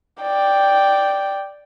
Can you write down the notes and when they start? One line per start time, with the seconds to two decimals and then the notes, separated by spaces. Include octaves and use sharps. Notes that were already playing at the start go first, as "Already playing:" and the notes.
0.23 D5 G5